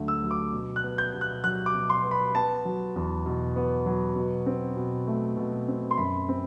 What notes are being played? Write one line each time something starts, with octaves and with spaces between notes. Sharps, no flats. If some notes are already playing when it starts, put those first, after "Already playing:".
Already playing: D2 D3 F#3 A3
E6
F#3
D6
B2
F#6
B3
G6
B2
F#6
F#3 F#6
D6
B2
C6
B3
B5
B3 A5
F#3
E2
B2
B3
F#3
B2
C4
B2
A3
B2
C4
C6
F#2 B5
C4